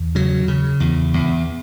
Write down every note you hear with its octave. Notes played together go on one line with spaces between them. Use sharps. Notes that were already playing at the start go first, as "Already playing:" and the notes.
Already playing: E2
C#3 F#3
C#3
E2
E2